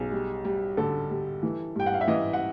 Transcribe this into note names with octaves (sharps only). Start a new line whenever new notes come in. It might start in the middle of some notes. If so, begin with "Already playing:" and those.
Already playing: B1 G#4
G3
G3
D3 A4
G3
E3
G2 G5
F#5
F5
E5
E3 D#5
F#5